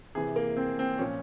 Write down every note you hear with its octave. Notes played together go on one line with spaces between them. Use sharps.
C3 E3 G#4
A#3
C4
C4
A#2 F3 C#4